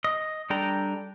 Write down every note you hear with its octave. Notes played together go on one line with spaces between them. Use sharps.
D#5
G3 D4 A4 G5 A#5